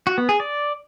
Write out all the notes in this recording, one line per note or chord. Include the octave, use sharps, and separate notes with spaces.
F#4
B3
G#4
D5